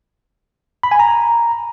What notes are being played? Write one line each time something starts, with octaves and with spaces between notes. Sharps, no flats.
B5
G#5
A#5